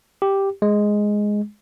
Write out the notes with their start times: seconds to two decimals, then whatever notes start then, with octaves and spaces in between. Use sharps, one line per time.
0.22 G4
0.62 G#3